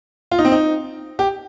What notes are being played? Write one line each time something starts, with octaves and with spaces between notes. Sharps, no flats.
F4
D#4
C4
D#4
G4